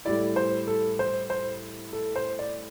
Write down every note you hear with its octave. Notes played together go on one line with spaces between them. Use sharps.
A2 G3 E4 D5
C5
A4
C5
C5
A4
C5
D5